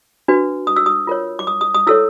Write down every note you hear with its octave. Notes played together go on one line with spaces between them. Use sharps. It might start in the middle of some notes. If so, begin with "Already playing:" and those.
D4 F#4 B4
D#6
E6
D#6
F4 A#4 C#5
D6
D#6
D#6
D#6
E4 A4 C#5 E6